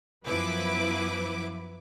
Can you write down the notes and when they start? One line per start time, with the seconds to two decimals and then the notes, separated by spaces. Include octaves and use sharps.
0.25 F#2 F3 B3 E4 B4 D6